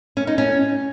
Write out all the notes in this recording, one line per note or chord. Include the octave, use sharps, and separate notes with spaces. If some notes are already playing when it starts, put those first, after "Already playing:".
C#4
D#4
C#4